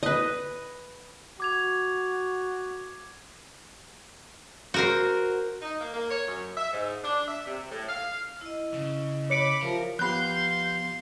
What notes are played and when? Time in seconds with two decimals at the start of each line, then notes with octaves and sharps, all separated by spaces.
0.03 B4 D#5
1.40 F#4 D6 G#6 F7
4.74 F#4 A#4 C5
5.62 D#4
5.81 A#3
5.94 A#3
6.10 C#5
6.27 F#2
6.56 E5
6.72 G#2
7.03 D4
7.27 E5
7.46 C3
7.70 A2
7.87 F5
8.41 E4 D#5
8.74 C#3
9.30 C#5 B5 D6 C#7 D7
9.62 F3 G4 A#4 E5 F5
9.99 F3 B3 G4 F5 B5 C6 F#6 G6